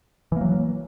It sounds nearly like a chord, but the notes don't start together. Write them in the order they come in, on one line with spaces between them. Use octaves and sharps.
E3 A#3 F#3